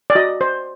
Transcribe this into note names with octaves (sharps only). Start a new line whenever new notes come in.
D5
F#4 D#5
C5